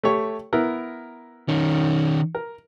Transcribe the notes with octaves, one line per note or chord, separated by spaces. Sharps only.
A3 G4 C#5
B3 E4 A#4
D#3 C#4
A#4